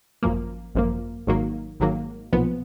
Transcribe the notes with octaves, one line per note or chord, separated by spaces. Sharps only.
G#1 F#2 F3 A#3
G#1 F#2 F3 A#3
G#1 G#2 D#3 F#3 A#3
G#1 G#2 D#3 F#3 A#3
B1 A#2 F3 B3